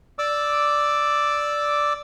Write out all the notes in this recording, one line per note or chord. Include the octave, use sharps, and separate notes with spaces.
D5 D6 E6